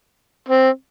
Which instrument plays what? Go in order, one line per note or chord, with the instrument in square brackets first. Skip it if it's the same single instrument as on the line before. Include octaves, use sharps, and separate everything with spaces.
[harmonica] C4